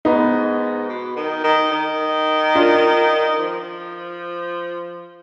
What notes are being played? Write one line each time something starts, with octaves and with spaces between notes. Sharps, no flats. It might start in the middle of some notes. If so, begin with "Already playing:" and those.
G#2 B3 D#4
B2
D#3
D#3
D#3
D4 F4
F3